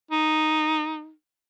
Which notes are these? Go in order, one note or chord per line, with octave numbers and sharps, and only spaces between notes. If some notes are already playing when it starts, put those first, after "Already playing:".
D#4